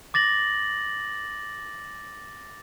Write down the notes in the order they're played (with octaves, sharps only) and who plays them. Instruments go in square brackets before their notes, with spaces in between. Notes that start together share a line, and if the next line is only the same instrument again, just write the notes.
[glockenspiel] D6 A6 A#6 F#7